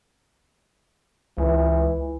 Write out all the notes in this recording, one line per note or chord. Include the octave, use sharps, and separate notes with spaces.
C#2 E3